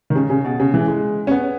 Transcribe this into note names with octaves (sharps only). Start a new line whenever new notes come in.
D#3
C#3
C#3
B2
C#3
E3
G#3
C#4
B3